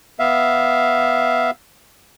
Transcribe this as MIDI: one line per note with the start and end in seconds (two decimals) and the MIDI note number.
0.19 1.51 59
0.19 1.51 76
0.19 1.51 77